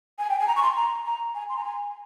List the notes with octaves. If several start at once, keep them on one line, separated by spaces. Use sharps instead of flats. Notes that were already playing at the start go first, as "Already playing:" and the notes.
G#5
G5
G#5
A#5
C#6
C6
A#5
A#5
G#5
C6
A#5
G#5